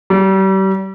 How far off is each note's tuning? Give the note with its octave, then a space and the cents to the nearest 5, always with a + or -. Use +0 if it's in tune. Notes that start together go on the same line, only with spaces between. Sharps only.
G3 -35